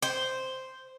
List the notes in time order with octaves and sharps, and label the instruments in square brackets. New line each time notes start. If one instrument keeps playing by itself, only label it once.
[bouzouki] C5